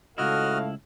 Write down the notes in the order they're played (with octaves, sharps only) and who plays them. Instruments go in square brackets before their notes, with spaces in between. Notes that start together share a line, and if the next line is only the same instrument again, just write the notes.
[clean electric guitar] C#2 E4 [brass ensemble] A2 A3 F5 [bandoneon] F#4 D#5 F6